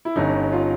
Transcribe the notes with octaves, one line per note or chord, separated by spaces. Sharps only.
E4
G1 G2 D3 C#4 D#4
F4